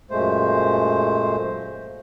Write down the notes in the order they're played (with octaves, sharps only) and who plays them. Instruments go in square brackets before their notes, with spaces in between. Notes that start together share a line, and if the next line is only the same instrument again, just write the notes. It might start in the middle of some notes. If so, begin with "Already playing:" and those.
[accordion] F#2 A#2 G#3 A3 C5